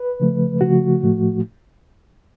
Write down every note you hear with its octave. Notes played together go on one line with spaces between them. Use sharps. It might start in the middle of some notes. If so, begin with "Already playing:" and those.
Already playing: B4
C#3 F3 A3
C#3 F3 A3 F#4
A2 F3 A3